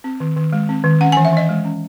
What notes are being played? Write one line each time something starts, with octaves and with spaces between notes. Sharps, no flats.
C4
D#3
D#3
G#3
C4
D#3
C#4 F#5
E3 G#5
E5
E3 D#5
G#3
C#4